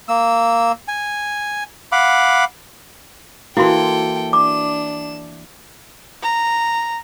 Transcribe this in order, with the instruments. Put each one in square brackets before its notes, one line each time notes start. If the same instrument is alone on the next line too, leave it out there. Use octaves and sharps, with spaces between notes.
[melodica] A#3 E6
G#5
F5 F#5 B5 D6
[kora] E3 A#3 [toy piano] E4 F#4 C6 [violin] A4 G5
[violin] D4 E7 [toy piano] D6
[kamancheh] A#5